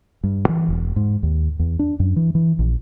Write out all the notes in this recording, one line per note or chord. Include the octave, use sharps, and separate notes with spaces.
G2
E3
E1
G#2
D#2
E2
D4
F#2
E3
E3
A#1